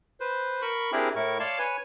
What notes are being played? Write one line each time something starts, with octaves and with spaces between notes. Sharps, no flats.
B4 C5
A#4 B5 C#6
C4 D4 E4 G4 G#4 A#4
A2 E4 A#4 C#6
C#5 D5 F5 A5 C6
B4 C#5 G#5